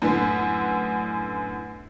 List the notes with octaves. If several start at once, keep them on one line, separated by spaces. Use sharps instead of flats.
F#2 A2 D3 B3